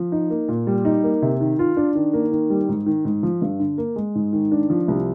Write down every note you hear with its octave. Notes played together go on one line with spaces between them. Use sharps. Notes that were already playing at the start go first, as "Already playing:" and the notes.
Already playing: F3
D#4
A#3
A#2
G3
D#4
A#3
C3
D#3
F4
D4
D#3
A#3
D#3
G3
G#2
D#3
G#2
F3
G2
D3
A#3
G#3
G#2
D#3
D4
F3
C2